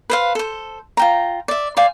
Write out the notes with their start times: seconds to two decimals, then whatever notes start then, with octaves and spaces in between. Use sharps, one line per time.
0.10 B4 C5 F5
0.35 A4 C5
0.97 F4 G5 A#5
1.48 D5 E5
1.77 C5 D5 F5 G#5